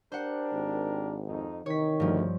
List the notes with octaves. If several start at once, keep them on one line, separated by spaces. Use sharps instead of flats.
D4 G4 A#4 C5 F#5
G#1
F2 D#4
C3 D#3 E3 D#4 C#5 B6
D2 G2 F3